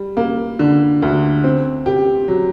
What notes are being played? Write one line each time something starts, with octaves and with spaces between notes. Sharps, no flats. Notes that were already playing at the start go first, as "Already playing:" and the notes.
Already playing: G3
A#3
D3
D2
C4
G4
F#3